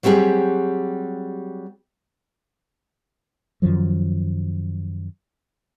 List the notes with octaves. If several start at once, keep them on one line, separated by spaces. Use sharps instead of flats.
F#3 G3 C4 G4 G#4
F#2 D#3 F3 F#3